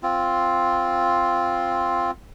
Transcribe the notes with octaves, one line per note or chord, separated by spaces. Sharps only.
C4 F4